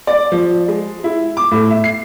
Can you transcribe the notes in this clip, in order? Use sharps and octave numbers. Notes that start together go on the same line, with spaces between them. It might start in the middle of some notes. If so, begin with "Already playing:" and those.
D5
F3
G#3
E4
D6
A2
E5
C7